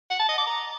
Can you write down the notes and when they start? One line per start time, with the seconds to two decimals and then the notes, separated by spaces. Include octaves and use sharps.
0.10 F#5
0.19 A5
0.29 D#5
0.38 D6
0.47 A#5